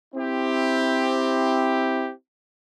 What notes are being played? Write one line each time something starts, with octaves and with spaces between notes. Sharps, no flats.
C4 E4 G4